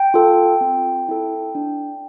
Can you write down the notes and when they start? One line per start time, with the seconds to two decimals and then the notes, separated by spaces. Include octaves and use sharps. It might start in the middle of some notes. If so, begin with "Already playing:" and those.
Already playing: G5
0.14 F4 A4
0.61 C4
1.09 E4 A4
1.55 D4